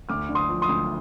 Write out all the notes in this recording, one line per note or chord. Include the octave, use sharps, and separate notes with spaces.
D2 D6 F6
D3
C6 D#6
F3
C6 D#6
D2